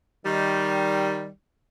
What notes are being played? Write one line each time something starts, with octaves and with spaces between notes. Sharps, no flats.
D#3 G3